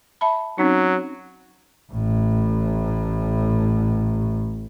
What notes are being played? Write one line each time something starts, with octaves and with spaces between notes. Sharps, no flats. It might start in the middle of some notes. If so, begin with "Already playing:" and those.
E5 A5 B5
F#3 C4 C#4 D#4
A1 A2